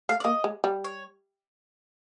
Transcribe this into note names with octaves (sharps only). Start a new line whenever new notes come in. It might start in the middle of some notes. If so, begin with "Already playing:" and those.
A3 F5
D5
A#3 D#5
G#3
G3
C#5